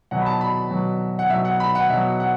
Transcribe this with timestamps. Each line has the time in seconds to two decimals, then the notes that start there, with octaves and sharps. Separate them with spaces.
0.11 B2 F#3 F#5
0.22 B5
0.26 A5
0.41 B5
0.71 B2 F#3
1.19 F#5
1.30 B2 F#3 E5
1.45 F#5
1.60 B5
1.75 F#5
1.89 B2 F#3 E5
2.20 F#5